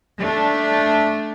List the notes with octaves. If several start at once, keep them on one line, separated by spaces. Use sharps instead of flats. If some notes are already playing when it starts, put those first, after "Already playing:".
A3 D4